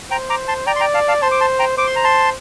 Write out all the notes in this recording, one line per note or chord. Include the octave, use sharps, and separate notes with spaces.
C5 G5 A#5
A#5 D6
A5 C6
D5 G5 A#5
C6
G5 A#5
F5 A5
F5 A5
C5 A5 C6
D6
A5 C6
G5 A#5
C5 D6
C6
A#5
A5 C6